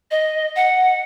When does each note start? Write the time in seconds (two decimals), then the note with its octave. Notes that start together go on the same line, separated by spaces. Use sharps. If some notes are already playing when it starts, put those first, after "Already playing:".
0.11 D#5
0.56 F#5